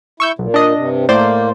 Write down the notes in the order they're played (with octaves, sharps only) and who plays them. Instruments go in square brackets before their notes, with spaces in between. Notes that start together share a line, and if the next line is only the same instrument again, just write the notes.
[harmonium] E4 [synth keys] C#6 E6 G6
[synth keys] B1 [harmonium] A#2
[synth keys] D4 D#5
[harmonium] G2 C3
[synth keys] A2 C5 D5 [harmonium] A#3